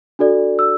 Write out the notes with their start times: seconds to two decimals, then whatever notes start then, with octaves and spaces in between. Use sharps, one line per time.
0.19 D4 F#4 A4 D5
0.59 E6